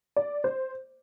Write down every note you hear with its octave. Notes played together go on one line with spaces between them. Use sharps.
D5
C5